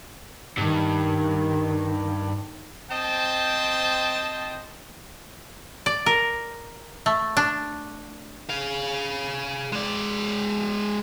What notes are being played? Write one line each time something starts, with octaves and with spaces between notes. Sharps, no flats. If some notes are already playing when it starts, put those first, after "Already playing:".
G2 D#3
C4 C5 D#5 G5 A5
D5
A#4
A3
D4
G#4 F5
G#3 D5